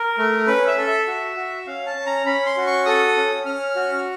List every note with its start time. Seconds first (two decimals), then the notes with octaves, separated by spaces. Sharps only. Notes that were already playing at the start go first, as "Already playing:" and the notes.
Already playing: A#4
0.18 A3
0.47 C#4 B4
0.67 E5
0.77 A4
0.87 E5
1.07 F#4
1.37 F#4
1.67 C#4 F5
1.86 A5
1.96 C#4
2.06 A#5
2.26 C#4 B5
2.46 C6
2.57 F#4
2.67 C#6
2.86 A4 D#6
3.16 C#4
3.46 C#4 F6
3.76 F#4